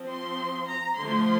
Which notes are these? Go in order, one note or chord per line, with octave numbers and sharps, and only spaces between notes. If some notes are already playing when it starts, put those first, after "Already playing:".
Already playing: F3 C4
C6
A#5
D3 F3 A3 C6